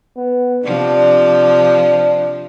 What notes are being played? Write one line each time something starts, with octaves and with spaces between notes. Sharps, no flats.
B3
C3 F3 D4